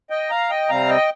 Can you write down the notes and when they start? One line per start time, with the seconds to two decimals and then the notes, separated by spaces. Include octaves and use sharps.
0.10 D#5 G5
0.30 F5 A#5
0.50 D#5 G5
0.69 C3 G3 C4 F5 A#5
0.89 D#5 G5